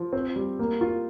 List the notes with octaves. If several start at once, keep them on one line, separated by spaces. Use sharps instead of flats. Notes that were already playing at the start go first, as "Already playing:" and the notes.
Already playing: F3
C4
G3
A#3
F4